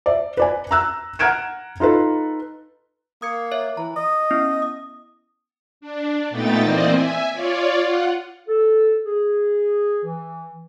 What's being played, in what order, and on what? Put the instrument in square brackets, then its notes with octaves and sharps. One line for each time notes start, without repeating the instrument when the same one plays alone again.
[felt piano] D5 E5
B4 D5 G#5
A#5 E6 F#6
F#5 A#5 F6 G#6 D7 E7
D#4 F4 A4 B4
[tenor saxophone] A#3 [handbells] D#6 G#6 C#7
[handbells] C#5 E5
[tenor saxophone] E3 [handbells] A#5
[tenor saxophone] D#5
[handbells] B3 C#4 E4
D#6
[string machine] D4
A#2 A3 B3 D#4 G5 A6
E3 A#3 C4 C5 D5 D#5
E5 G#5
F4 C#5 D5
F4 F#5
[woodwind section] A4
G#4
E3